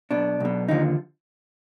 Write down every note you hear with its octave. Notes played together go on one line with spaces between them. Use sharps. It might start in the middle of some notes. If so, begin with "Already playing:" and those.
B1 B2 D4
B1 B2
D#2 D3 F3 D#4